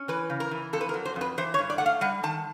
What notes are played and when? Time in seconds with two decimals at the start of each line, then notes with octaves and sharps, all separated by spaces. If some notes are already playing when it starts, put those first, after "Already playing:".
Already playing: C#4
0.08 E3 B4
0.30 C#3
0.40 A#4
0.51 E3
0.73 F2 A4
0.81 B4
0.89 A#4
0.94 F#3
1.05 C5
1.16 F2
1.21 B4
1.38 E3 C5
1.54 C#5
1.58 G2
1.70 D5
1.78 A3 F#5
1.86 F5
2.01 G3 F#5
2.23 D#3 A5